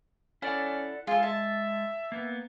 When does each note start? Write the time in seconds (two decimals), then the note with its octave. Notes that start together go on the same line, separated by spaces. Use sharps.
0.42 C#4 E4 A4 D5 F#5
1.07 G#3 F4 G#4 A4
1.23 E5 A5
2.12 A#3 B3